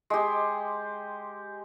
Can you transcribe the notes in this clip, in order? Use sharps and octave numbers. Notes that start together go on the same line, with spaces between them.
G#3 G4